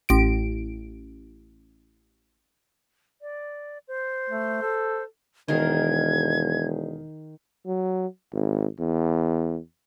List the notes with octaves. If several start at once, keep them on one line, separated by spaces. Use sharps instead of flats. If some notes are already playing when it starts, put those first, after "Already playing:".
A1 D7
D5
C5
A3
A4
E1 D#3 G#4 A#4 G#6
F#3
G#1
E2